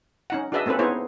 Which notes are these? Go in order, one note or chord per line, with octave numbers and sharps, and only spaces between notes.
C#4 D#4 F#5
D4 F#4 G#4 B4 D#5 E5
A#3 C4 C#4 A4 B4
B3 D#4 E4 G#4 C5 C#5